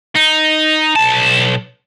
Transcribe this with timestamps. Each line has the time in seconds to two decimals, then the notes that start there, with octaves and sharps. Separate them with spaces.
0.15 D#4
0.96 B1 A5